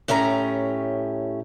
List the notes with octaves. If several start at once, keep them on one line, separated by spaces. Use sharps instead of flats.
A2 A3 C#4 G4 A#5